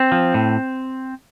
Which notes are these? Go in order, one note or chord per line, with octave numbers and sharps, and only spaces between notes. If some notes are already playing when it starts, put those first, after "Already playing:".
Already playing: C4
F3
A2